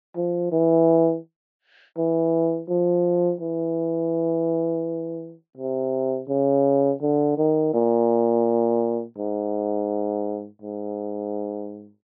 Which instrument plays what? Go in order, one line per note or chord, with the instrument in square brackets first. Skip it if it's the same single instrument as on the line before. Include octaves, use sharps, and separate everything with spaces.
[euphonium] F3
E3
E3
F3
E3
C3
C#3
D3
D#3
A#2
G#2
G#2